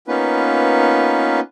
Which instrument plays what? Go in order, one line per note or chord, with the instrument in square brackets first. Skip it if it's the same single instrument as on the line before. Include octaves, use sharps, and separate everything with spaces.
[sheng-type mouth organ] A#3 B3 C#4 D#4 F4 B4